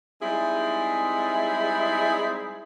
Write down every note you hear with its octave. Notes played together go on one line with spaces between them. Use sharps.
G3 G#3 C4 D#4 E4 G#4